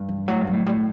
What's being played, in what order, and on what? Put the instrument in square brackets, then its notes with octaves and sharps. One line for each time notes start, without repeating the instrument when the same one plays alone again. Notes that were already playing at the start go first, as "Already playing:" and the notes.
Already playing: [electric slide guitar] G2
[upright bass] E3
[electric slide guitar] A2 [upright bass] F#3
[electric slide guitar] G2
[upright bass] F#3
[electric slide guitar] A2
[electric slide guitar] A2 [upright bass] G3
[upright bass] A3